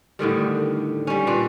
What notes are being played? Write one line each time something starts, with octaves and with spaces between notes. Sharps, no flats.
A2 D3 D#3 G3
G3 C#4
A#2 D4 B4